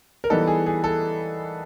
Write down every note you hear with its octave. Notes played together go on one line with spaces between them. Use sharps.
A#4
E3 G3 B3 D#4 A4
G#4
G#4
A4